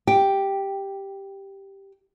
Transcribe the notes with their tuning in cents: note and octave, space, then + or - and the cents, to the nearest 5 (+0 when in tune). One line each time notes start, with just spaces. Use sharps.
G4 +0 G5 +0